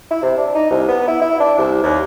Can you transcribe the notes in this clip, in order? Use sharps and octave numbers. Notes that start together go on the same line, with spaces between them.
E4
C3
D4
D#4
C2
B3
E4
E4
D4
C2
D#2